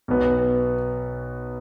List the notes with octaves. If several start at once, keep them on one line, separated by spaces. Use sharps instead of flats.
B1 B2 B3